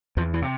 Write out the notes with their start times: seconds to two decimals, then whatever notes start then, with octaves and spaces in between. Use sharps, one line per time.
0.17 E2 F3
0.34 E3
0.42 C3